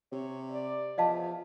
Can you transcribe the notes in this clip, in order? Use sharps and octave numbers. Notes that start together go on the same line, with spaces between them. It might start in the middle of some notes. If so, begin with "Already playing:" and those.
C3 C#5
D5
E2 F3 D#5 F5 A5